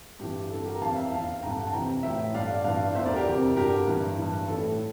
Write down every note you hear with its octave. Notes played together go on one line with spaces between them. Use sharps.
G2 E3 G4
G2 D3 A4
G4 A#4
A#5
F2 E3 F5 A5
E5 G5
E2 E3 F5 A5
G2 D3 G5 A#5
A5
F2 C3 E3 G5 A#5
A2 E3 E5 G5
G2 D3 D5 F5
G2 E3 D5 F5
E2 D3 C5 E5
A#4 D5
G4 A#4
F2 C3 E3
G2 D3 G4 A#4
G2 E3
G2 E3
E3 A4
A2